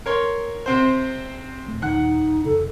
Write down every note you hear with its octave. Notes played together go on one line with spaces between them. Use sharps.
A#4 C#5 C6
C3 C4 C5
D#1 A3
D#1 D#3 D#4 F#5 F#6
F2 C3 A4